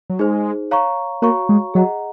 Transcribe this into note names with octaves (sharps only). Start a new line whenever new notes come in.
F#3
G#3 D#4 G#4 C5
C#5 F5 A#5 C#6
A#3 F#4 C#5 F5 A#5 C#6
G#3
F#3 G#4 D#5 F#5 A#5